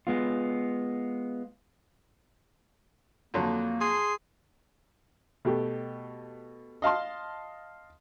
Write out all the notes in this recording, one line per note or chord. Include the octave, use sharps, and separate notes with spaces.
G#3 B3 F4
F2 D3 F#3 A#3
G#4 C6
B2 A3 G4
D#5 F5 A5 C6